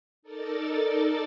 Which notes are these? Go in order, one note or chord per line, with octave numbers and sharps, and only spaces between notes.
D#4 A4 A#4 D5 A6